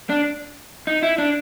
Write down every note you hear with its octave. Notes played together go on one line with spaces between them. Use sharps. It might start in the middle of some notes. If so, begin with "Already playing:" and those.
D4
D#4
E4
D4